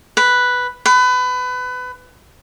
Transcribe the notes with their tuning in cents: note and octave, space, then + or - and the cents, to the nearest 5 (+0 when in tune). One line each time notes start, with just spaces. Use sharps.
B4 +0
B4 +25